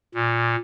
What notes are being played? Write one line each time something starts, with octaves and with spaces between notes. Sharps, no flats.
A#2